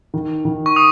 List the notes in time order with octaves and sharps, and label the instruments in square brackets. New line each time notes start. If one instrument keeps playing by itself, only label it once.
[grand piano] D#3
D#3
[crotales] C#6
D#6